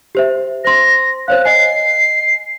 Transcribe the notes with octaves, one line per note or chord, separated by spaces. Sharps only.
G4 C5 E5
C5 C6 A#6
C5 C#5 F5 F#6
D#5 G#5 C7